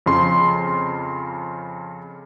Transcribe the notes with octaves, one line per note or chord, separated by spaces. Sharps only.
F2 C#3 C6